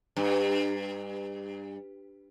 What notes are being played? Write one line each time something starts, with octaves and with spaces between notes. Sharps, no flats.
G2